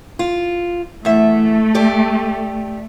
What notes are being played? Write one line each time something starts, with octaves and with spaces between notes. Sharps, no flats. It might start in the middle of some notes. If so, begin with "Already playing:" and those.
F4
E2 A3 E5
G4 D5